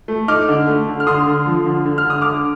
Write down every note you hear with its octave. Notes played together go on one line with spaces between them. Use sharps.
A3
D#4 D6 F6
D3
A3
D3
F6
D3 C6 D#6
D3
F3
D3
D3
F6
D3 D#6
D3 D6 F6